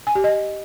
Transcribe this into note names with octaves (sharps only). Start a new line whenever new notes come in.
G#5
G4
D#5